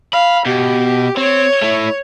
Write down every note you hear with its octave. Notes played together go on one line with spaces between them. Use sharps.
F5 B5
B2 G4
C4 C#5
A3 E4